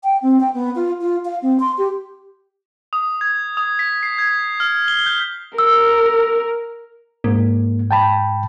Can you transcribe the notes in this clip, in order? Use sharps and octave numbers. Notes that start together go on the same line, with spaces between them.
G5
C4
G5
B3
F4
F4
F5
C4
C6
G4
D#6
G#6
D#6
B6
C7
G#6
F6
G7
G6
A#4 E6
G#2 A#3
G5 A5 B5